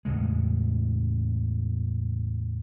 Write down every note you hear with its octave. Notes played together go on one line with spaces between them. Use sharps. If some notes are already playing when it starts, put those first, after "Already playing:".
E2 A2 C#3 G#3